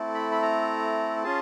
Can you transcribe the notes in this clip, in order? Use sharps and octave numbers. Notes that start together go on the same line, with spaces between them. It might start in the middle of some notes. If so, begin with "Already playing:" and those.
Already playing: A3 C4 E4 A4
B5
B5
A#5
C#4 F4 G#4 A5